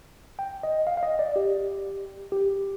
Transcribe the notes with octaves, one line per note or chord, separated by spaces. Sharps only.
G5
D#5
F5
F5
D#5
D5
G4
G4